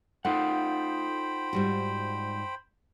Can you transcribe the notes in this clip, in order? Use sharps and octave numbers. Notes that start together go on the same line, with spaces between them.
A3 D#4 F4 C5 F#5 G5 B5
G#2 G3 F#4